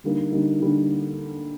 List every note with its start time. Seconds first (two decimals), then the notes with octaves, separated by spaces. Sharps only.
0.04 D3 G3 A#3 D#4
0.31 D3 G3 A#3 D#4
0.60 D3 G3 A#3 D#4